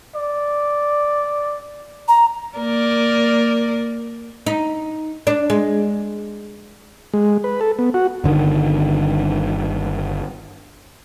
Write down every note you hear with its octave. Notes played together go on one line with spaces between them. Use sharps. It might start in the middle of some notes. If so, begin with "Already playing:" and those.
D5
A#5
A#3 A#4 D5
D#4
D4
G#3
G#3
B4
A4
B3
F#4
G1 D3 D#3